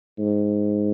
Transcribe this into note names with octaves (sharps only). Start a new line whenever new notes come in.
G#2